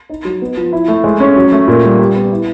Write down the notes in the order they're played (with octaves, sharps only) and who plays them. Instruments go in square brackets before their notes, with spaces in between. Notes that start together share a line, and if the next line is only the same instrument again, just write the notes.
[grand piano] D#4
F#3
B3
F3
E4
A3
G#3
C#4
F#3
A3
A#2
G3
G4
B3
E4